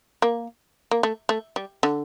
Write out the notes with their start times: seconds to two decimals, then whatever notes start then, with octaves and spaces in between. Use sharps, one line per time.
0.22 A#3
0.91 A#3
1.03 A3
1.29 A3
1.56 G3
1.83 D3